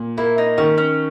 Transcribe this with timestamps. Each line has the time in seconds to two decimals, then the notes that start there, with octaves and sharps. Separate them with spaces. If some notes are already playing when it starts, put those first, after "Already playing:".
Already playing: A#2
0.18 A#3 E4
0.38 D#4
0.58 D#3 C#4
0.78 C#4